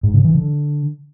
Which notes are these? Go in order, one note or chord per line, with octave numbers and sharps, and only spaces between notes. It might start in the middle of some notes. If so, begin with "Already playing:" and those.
G#2
C#3
E3
D3